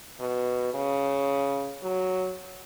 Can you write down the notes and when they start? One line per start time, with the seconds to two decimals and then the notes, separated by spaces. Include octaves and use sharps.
0.20 B2
0.74 C#3
1.83 F#3